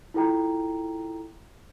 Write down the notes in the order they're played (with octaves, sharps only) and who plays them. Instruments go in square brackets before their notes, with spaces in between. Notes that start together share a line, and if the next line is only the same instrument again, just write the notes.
[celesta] E4 F4 A4 G5 A#5